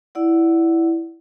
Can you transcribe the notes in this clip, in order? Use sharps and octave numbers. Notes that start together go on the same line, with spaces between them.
E4 D5 F#5